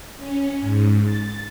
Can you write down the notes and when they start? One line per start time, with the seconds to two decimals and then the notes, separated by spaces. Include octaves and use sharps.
0.16 C#4
0.61 G#2
1.03 A6